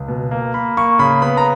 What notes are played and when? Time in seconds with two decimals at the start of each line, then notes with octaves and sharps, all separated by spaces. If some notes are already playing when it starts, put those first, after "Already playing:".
Already playing: C#2
0.08 B2
0.31 A#3
0.54 A#3 B5
0.77 A#3 C#6
0.99 C#3 B5
1.22 B3 B5
1.37 A#5